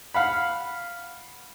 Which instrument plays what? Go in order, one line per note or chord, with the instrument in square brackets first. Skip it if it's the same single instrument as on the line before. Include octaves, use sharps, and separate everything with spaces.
[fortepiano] F5 F#5 B5